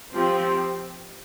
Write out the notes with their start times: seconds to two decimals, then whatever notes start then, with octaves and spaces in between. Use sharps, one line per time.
0.14 F3 C4 G4